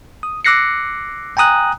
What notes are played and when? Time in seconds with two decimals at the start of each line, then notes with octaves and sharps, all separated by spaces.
0.23 D#6
0.45 D6 E6 F#6 A#6 C7 C#7
1.37 G5 G#5 A#5 D#6 F#6